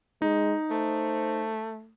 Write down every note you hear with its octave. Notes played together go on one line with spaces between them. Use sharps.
G#3 D#4
A3 C5